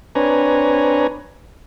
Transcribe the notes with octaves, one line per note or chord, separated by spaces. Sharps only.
C4 D4 B4 C#5 G#5 A#5